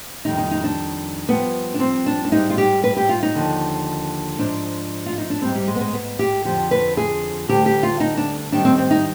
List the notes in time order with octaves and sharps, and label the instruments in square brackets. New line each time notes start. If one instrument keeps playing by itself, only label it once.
[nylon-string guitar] F2 D#3 G3 D#4
D#4
D#4
D4
G2 F3 B3
D4
C4
D4
D4
G#2 G3 D#4
F4
G4
B4
G4
F4
D#4
D#2 D3 F3
G#2 F3 D4
F4
D#4
D4
G#2 G3 C4
G3
G#3
B3
G#3
B3
G4
F2 D3 F3 G4
B4
G#4
D2 D3 G3 G4
G4
F4
D#4
D4
G#2 D#3 G3 D4
C4
C4
D#4